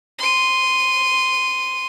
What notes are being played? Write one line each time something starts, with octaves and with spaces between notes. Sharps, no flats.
C6 D#7